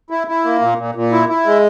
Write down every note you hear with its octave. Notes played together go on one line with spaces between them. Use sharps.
E4
E4
A#3
A#2
A#2
A#2
E4
E4
G#3